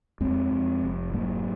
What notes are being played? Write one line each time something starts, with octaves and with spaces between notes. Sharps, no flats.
F2 G#3 C4
F2
F1
G#2 F#3 A#3